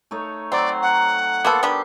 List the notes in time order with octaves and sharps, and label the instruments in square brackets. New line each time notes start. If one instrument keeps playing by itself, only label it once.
[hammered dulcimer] A3 D#4 C#5
[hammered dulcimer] F#3 [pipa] C4 [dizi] D5
[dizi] F#5
[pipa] A#3 B3 A4 [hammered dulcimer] A#4 C5 C6
[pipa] B3 D4 G4 [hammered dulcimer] E5